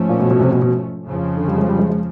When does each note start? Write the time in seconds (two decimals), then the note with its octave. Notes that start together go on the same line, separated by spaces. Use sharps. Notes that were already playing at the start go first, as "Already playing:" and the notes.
Already playing: G#2 F3 A3 C#4
0.09 A#2
0.20 B2
0.31 B2
0.41 C3
0.52 B2
0.62 B2
1.05 F2 C#3 F3
1.37 D3
1.48 G3
1.58 G#3
1.69 G3
1.79 G#3
1.90 G#3